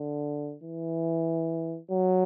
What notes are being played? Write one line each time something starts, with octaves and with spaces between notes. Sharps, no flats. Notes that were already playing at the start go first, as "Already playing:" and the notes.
Already playing: D3
E3
F#3